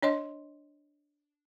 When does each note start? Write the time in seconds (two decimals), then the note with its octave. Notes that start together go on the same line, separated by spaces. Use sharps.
0.03 D4 C#5 D#5 C6